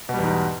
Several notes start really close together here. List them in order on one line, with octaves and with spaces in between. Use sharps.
B2 G3 E2 G#2